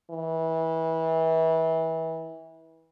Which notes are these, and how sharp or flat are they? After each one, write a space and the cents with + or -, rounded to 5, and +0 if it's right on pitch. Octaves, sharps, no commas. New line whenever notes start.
E3 -25